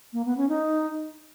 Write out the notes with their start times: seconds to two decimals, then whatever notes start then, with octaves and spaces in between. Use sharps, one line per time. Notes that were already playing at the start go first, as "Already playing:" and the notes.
0.13 A#3
0.25 B3
0.37 C#4
0.49 D#4